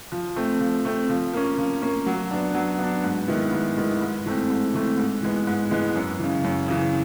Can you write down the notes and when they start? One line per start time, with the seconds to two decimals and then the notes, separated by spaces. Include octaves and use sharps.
0.12 F3
0.36 A3 C4
0.60 F3
0.85 A3 C4
1.10 F3
1.34 A#3 C#4
1.58 F3
1.82 A#3 C#4
2.06 F#3
2.31 B3 D4
2.55 F#3
2.79 B3 D4
3.04 G#2
3.28 D#3 G#3 B3 E4
3.52 G#2
3.77 D#3 G#3 B3 E4
4.01 G#2
4.26 E3 A3 C4
4.50 G#2
4.74 E3 A3 C4
4.98 G#2
5.23 E3 G#3 B3
5.47 G#2
5.71 E3 G#3 B3
5.95 F#2
6.19 C#3 E3
6.44 F#2
6.68 C#3 E3